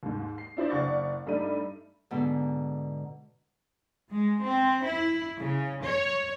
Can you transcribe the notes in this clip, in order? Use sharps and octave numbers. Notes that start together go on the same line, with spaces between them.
D#2 G#2
C7
D4 E4 C5 D5
F#1 D5 F5 F#5 C#6 A6
G2 G3 A3 D#4 D5 D#7
G#2 B2 D3
G#3
C4
E4
C#3
C#5